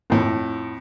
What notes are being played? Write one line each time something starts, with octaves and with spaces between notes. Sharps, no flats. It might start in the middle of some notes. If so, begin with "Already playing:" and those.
F2 A2